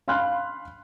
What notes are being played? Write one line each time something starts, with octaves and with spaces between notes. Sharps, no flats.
F5 B5 C6 F6 F#6